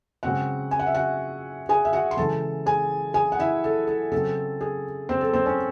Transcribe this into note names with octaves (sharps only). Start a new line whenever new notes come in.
C#3 G#3 C4 F#4 F#5
G#5
F#5
E5
F#4 F#5
G#4 G#5
E5
F#4 F#5
C6
C#3 E3 G#3 A4 A5
G#4 G#5
G#4 G#5
F#5
E4 E5
A4
A4
C#3 F#3 C4 A4
G#4
C4 C5
A4
C4 C5
C#4 C#5